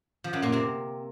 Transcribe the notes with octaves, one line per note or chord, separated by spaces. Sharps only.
F3
F#2 F#3
A#2 A#3
C3 C4